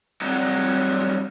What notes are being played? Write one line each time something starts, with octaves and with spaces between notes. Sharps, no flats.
F#3 G3 C4 F#5 A#5